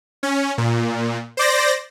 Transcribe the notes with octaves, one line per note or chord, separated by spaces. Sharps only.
C#4
A#2
C5 D5 A#6